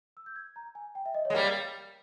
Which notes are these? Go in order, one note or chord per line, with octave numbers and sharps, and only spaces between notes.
E6
G6
G#6
A#5
G#5
G5
E5
D#5
C#5
G#3
G3 A#3